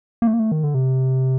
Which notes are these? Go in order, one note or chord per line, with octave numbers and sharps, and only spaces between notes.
A#3
A3
A#3
A3
D#3
D3
C3